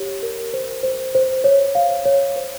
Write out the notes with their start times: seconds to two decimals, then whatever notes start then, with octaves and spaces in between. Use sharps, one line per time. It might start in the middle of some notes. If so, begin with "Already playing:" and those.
Already playing: G4 C#5
0.23 A#4
0.54 C5
0.83 C5
1.15 C5
1.44 C#5
1.75 F5
2.05 C#5
2.36 C5